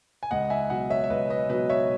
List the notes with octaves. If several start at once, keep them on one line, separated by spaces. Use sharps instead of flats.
G#5
C#2 D#5 F#5
E5 G#5
B2 F#3 D#5 F#5
C#5 E5
E5
C#2 B4 D#5
B4 D#5
B2 F#3 B4 D#5
C#5 E5